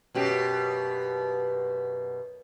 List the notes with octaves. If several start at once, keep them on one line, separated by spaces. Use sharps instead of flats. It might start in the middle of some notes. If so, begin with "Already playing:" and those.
F#2 B2 G4